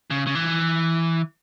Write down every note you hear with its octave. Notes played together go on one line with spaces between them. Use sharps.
C#3
C#3
E3